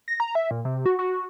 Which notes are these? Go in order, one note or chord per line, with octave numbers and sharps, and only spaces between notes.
A#6
A#5
E5
A#2
C3
F#4
F#4